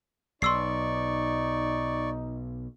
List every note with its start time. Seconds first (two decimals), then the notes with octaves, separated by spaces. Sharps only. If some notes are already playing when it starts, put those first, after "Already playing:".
0.42 B1 D#4 D5 C6 C#6 E6 C7